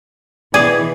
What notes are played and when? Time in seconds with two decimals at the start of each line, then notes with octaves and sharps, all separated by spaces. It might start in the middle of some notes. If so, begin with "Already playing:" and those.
0.54 B2 E3 G#4 D5